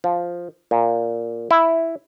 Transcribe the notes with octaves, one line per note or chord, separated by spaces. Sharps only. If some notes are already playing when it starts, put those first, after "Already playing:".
F3
A#2
E4